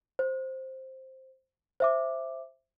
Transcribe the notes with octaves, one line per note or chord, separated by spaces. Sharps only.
C5
C5 E5 D6